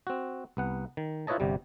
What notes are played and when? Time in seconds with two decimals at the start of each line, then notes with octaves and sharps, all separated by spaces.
0.07 C4 F#4
0.57 C2 B3 F#5
0.97 D#3
1.27 E4 F4 B4 C#5 D#5 A5
1.40 G1 C3 G3